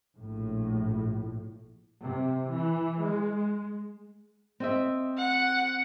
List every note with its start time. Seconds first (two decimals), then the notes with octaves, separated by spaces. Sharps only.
0.19 A#1 A2
2.00 C3
2.52 E3
3.01 G#3
4.60 C4 D#5 E5
5.17 F#5